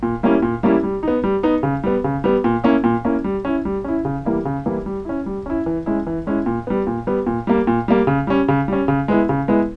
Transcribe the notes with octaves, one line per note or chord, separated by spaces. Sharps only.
A#2
G3 A#3 C#4 E4
A#2
G3 A#3 C#4 E4
G3
B3 D#4
G3
B3 D#4
C#3
G3 B3
C#3
G3 B3
A#2
A#3 C#4 E4
A#2
A#3 C#4 E4
G3
C#4 E4
G3
C#4 E4
C#3
E3 G3 A#3 E4
C#3
E3 G3 A#3 E4
G3
C#4 E4
G3
C#4 E4
E3
G#3 C#4 E4
E3
G#3 C#4 E4
A#2
G3 B3
A#2
G3 B3
A#2
G3 A#3
A#2
G3 A#3
C#3
G3 C#4
C#3
G3 C#4
C#3
G#3 B3 E4
C#3
G#3 B3 E4